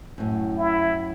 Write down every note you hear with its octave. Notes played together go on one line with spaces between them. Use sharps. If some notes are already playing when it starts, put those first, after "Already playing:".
F#2 A2
E4